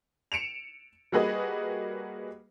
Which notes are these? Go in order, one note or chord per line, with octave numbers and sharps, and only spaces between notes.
C#7 D7 E7 F7
G3 A#3 F#4 G#4 B4 D#5